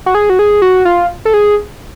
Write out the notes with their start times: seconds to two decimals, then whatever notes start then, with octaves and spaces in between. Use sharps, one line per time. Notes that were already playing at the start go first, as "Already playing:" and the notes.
0.06 F#4
0.15 G#4
0.30 F#4
0.39 G#4
0.62 F#4
0.85 F4
1.25 A4
1.34 G#4